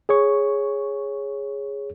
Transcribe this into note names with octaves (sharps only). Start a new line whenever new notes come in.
G#4 C#5 C#6